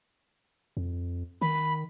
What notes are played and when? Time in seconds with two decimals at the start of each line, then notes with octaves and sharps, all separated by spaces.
0.77 F2
1.41 D#3 B5